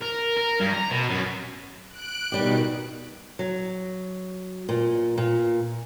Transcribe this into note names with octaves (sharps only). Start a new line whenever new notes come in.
A#4
A#4
G2
A#5
B2
F#2
F#6 D7
B2 D#3 G3 G4
F#3
A#2
A#2